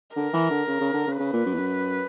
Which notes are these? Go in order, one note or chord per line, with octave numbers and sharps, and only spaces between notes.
D3 A#4
E3
D3
C#3
C#3
D3
C#3
C#3 B4
A#2
F#2
E2
F#2